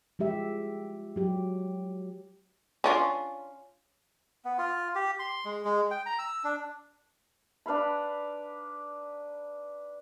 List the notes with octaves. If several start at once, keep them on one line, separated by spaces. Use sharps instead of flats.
F3 G#3 G4 E5
F#3 G4
C#4 D4 F4
B3
F4
G4
C6
G#3
G#3
G5
A#5
E6
D4
D4 B4 F5 B5